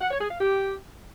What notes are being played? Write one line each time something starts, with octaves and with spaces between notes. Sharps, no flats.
F#5
C#5
G#4
F5
G4